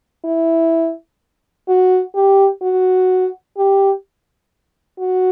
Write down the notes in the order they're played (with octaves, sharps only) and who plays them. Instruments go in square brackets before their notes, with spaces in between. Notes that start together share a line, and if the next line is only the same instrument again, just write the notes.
[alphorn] E4
F#4
G4
F#4
G4
F#4